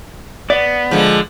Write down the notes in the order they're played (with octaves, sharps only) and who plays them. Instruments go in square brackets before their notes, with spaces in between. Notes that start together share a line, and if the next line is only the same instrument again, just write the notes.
[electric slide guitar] B3 [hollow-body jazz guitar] D5
[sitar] D3 F3 [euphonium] G#3